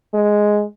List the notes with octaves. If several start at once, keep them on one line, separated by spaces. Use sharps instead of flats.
G#3